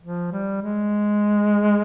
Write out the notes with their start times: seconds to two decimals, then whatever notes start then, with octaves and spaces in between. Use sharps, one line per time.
0.02 F3
0.32 G3
0.62 G#3